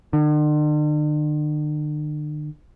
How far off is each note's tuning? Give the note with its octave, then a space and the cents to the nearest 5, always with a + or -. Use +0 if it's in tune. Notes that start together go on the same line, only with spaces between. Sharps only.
D3 +45